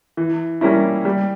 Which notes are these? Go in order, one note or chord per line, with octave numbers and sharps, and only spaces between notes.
E3
G3 A#3 C#4 E4
G3